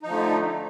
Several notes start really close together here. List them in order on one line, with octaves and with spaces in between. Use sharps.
D#4 F3 D3 A3